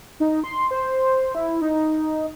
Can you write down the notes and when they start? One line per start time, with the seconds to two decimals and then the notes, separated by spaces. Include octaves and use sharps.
0.20 D#4
0.44 C6
0.71 C5
1.35 E4
1.61 D#4